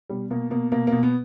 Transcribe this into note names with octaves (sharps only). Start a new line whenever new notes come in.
B2 G3
B2 A#3
B2 A#3
B2 A#3
B2 A#3
B3